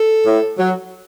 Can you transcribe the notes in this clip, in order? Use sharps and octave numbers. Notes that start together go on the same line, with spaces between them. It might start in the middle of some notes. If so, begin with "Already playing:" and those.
Already playing: A4
A2
F#3